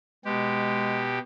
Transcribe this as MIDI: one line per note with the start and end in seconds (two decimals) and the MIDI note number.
0.25 1.19 47
0.25 1.16 56
0.25 1.19 67